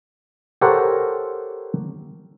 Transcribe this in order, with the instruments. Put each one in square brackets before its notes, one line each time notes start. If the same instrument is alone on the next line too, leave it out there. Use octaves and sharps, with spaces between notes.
[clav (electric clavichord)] G4 A4 A#4 C5 C#5 F#5